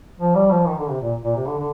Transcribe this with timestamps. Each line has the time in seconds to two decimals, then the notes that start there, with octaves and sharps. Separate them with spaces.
0.19 F3
0.35 G3
0.50 F3
0.66 D#3
0.78 D3
0.89 C3
1.00 A#2
1.24 A#2
1.35 C3
1.47 D3
1.58 D3